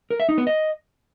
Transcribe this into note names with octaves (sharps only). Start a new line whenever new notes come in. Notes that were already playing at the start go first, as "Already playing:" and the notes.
A#4
E5
D#4
B3
D#5